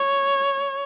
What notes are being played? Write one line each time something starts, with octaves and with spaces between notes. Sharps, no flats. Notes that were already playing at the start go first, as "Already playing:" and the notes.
Already playing: C#5